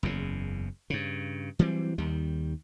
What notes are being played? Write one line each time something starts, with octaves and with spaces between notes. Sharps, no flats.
F#1 E2 C#3
G2 C#3
E3 F#3 G3 C4
D#2 D#3 G3